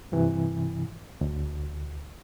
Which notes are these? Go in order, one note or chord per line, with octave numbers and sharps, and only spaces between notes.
G2 C3 E3
D2